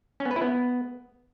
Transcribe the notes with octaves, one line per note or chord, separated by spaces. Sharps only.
C#4
B3
B4
E4
B3